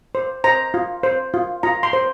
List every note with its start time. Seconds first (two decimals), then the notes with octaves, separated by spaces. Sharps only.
0.15 C5
0.44 C5 A#5
0.74 F4
1.03 C5
1.34 F4
1.63 F4 A#5
1.83 C6
1.93 C5